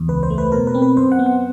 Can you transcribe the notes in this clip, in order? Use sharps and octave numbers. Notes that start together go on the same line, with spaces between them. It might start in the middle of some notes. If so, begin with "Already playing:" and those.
Already playing: E2
C#2 B4
C5
A3
B4
B2 A#4
B4
C4
B4
F#2 C5
F#5
B3
F#5